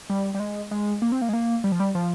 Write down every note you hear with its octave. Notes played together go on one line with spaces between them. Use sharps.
G3
G3
G#3
G#3
A#3
C4
A#3
G#3
A#3
G3
F3
G3
F3